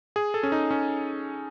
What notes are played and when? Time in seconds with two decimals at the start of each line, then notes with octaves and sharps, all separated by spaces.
0.16 G#4
0.34 A4
0.43 C#4
0.52 D#4
0.71 C#4